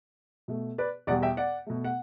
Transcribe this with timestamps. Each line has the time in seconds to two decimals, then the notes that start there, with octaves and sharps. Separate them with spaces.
0.48 B2 A3
0.78 B4 D5
1.07 E2 B2 G3 D5 F#5
1.22 E5 G5
1.37 D5 F#5
1.67 B2 A3
1.84 F#5